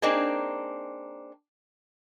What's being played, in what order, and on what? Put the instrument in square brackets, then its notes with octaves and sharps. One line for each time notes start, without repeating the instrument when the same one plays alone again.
[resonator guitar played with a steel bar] A#3 C4 D4 D#4 G#4